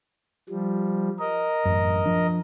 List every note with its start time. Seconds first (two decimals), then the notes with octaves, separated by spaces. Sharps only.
0.49 F3 G3
1.19 A#4 D#5
1.65 A1 F#2
2.06 F3 D4